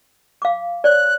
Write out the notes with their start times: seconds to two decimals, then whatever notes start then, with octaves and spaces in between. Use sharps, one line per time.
0.42 F5 D6
0.84 C#5 D5 F#6